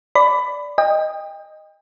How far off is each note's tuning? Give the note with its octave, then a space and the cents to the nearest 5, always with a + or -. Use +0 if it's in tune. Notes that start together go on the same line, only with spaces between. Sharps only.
D5 -5 B5 +20
D#5 +0 G5 +35